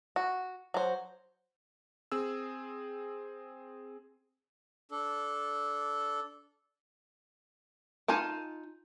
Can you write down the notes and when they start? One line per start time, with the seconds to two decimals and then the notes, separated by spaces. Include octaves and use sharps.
0.16 F#4
0.74 F#3 C5
2.12 C4 G#4 E6
4.91 D4 A4
8.08 D#4 F4 G#5 A5